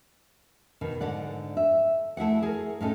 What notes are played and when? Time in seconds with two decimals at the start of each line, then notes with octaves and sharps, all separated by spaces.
0.81 B2 D#3
1.01 G#2 D3 D5 F#5
1.57 E5
2.17 A3 E4 G#4 F#5
2.42 G#4 A#4
2.81 A2 C#4 D#4 A4